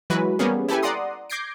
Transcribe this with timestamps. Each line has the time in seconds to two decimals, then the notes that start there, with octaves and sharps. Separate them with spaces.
0.10 E3 F#3 G#3 F#4 B4
0.39 G3 A#3 B3 C#4 G#4
0.68 E4 G4 A4 B4 G#5
0.83 D5 F#5 A#5 C6 D#6
1.30 D6 G6 G#6 A#6 C7 D7